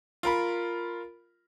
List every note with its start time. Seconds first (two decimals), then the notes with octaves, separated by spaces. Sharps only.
0.23 F4 A#4 B5